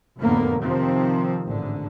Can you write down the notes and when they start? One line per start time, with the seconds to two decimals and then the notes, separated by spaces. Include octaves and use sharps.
0.19 F1 F#2 A2 D3 A#3 B3
0.63 C3 D#3 F3 C4
1.45 A1 G#2 D3